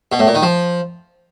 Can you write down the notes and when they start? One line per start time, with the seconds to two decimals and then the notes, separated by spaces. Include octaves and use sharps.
0.12 B2
0.19 A2
0.27 A#2
0.35 D#3
0.42 F3